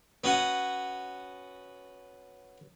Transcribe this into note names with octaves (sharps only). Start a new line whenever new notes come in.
B3 C#4 F#4 F#5